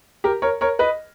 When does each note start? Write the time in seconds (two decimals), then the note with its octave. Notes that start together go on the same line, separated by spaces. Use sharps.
0.24 G4 A#4
0.42 A#4 C#5
0.61 A#4 C#5
0.79 B4 D#5